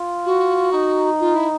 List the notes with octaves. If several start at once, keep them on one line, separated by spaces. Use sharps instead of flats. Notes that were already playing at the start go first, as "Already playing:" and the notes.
Already playing: F4
F#4
D#4
F4
E4